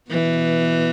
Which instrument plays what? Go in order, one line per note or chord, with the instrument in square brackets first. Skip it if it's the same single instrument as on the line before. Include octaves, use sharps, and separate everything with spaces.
[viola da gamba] B2 E3